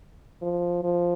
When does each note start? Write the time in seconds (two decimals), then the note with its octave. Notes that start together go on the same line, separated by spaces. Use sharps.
0.42 F3
0.83 F3